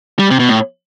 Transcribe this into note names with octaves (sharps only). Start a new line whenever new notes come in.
G3
C3
B2
A2